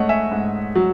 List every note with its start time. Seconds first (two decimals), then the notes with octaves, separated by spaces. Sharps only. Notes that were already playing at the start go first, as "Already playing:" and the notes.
Already playing: G#2 A3 C#5 D#5 F#5
0.09 E5 G#5
0.31 G#2
0.75 F#3